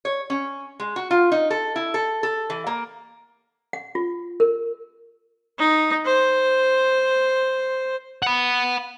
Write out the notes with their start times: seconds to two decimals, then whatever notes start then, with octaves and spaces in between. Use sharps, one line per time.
0.05 C#5
0.30 C#4
0.80 G#3
0.96 F#4
1.11 F4
1.32 D#4
1.50 A4
1.76 E4
1.94 A4
2.23 A4
2.50 E3
2.67 A#3
3.73 F#5
3.95 F4
4.40 A#4
5.58 D#4
6.05 C5
8.22 F#5 B5